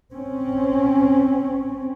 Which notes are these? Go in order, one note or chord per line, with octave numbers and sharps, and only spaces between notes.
C4 C#4